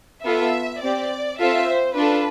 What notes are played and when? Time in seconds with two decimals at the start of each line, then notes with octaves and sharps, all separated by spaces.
0.24 B3 F4 A4 E5
0.81 C4 G4 D5
1.38 C4 F4 A4 E5
1.67 C5
1.95 D4 F4 A4 B4